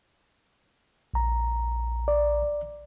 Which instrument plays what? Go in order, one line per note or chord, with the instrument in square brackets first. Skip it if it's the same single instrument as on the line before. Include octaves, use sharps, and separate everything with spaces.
[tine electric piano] A#1 A#5
[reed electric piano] D5